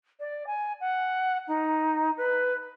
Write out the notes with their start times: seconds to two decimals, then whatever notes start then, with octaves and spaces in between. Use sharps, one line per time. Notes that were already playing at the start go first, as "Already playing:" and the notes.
0.20 D5
0.47 G#5
0.81 F#5
1.48 D#4
2.17 B4